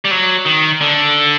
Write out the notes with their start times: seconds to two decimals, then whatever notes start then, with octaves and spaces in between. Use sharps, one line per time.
0.05 G3
0.11 F#3
0.46 D#3
0.81 D3